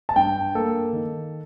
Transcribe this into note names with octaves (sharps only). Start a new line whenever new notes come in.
A5
G2 G5
A#3 A4
D#3